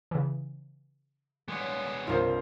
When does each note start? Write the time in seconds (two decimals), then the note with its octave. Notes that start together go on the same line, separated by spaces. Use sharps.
0.11 C#3 E3
1.48 G3 G#3 B3 C#5
2.07 C2 G2 F4 A#4 C5